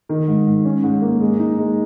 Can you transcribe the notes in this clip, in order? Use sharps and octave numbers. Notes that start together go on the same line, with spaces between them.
D#3
G#2
G#2
C#4
G#2
A#3
G#3
D#4
G#3